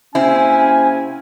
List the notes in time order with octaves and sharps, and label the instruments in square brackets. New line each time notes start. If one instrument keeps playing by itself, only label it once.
[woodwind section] C3 A#3 C#4 [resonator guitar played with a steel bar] C4 E4 [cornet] G#5